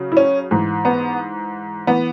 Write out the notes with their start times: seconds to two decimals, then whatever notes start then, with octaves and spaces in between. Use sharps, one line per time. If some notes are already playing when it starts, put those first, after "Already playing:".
Already playing: C#3 F#3
0.12 E4
0.17 C#4
0.51 G#2 E3
0.85 B3
1.87 E3 B3